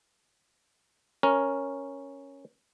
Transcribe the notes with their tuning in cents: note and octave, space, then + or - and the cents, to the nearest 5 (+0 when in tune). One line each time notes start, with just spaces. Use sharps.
C#4 +0 A#4 +0